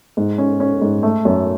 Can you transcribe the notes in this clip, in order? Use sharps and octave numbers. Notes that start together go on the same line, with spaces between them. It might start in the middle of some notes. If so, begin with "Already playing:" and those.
G#2
C#4
C#4
G#2
A3
F#2